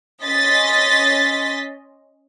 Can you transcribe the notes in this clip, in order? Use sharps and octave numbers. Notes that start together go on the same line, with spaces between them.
C#4 D#5 C6 A6 B6